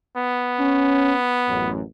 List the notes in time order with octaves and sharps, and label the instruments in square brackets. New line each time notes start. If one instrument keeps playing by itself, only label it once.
[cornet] B3
[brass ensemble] C#4
A1 F#2